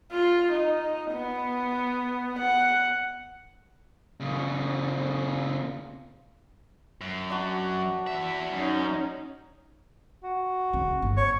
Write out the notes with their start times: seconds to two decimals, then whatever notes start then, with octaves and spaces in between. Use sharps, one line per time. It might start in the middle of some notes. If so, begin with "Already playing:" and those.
0.12 F4
0.52 D#4
1.12 B3
2.39 F#5
4.20 A#2 C#3
7.01 F#2
7.30 D4 F#4
8.07 E2 E5
8.51 F#2 C#4 D#4
10.23 F#4
10.73 C#3
11.02 G1
11.17 C#5